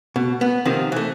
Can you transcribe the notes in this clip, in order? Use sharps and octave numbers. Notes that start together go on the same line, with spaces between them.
B2
B3
C3 D#3 F3 C4
E3 A3